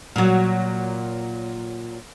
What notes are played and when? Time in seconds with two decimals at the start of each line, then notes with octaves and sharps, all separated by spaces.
0.16 A#2 F#3